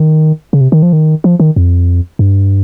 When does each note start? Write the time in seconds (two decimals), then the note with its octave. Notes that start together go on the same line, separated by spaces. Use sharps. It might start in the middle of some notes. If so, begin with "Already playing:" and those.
Already playing: D#3
0.53 C#3
0.61 C3
0.72 D#3
0.83 F3
0.93 D#3
1.24 F3
1.40 D#3
1.56 F2
2.19 G2